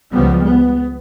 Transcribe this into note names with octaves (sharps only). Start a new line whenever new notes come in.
C#2 F3 G3 B3
B3